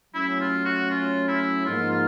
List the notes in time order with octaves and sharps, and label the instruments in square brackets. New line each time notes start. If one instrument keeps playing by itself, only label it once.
[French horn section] F#3 A3 C#4 [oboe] E4
[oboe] F4
F#4
F4
E4
[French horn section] G#2 F3 A#3 D#4 [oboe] F4
[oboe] F4